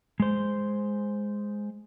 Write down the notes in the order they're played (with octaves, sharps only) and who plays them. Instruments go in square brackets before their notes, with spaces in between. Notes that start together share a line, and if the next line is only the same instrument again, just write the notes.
[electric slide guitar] G#3 C5